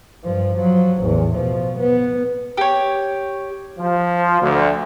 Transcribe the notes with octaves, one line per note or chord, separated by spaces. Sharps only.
G2 F3
F3 F#3
A1 E2
B2 F3
B3
G4 C#5
F3
D2